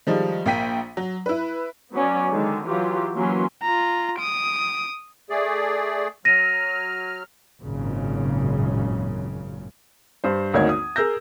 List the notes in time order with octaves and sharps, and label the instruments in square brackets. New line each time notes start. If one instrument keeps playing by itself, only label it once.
[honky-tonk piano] D#3 F3 G3 G#3
A#1 A#3 G5 B6 D#7
F#3
E4 B4
[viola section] F#3 B3 C#4 D5
D3 D#3 G#3
E3 F#3 F4 G4
E3 F#3 A#3 C#4 C6
[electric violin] F4 A#5
D#6 D7
[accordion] A3 G#4 D5
[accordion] F#3 F6 [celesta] A#6 D#7
[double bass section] G#1 F#2 A#2 C#3
[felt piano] G2 C5
G#1 D2 A#3 D#4 C#5 G#6
D#6
G#4 A#4 E6 G6 A#6